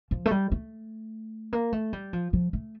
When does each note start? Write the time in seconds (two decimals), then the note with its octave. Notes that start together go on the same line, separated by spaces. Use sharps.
0.11 F3
0.26 A3
0.31 G3
0.52 A3
1.53 A#3
1.73 A3
1.93 G3
2.13 F3
2.33 F3
2.53 A3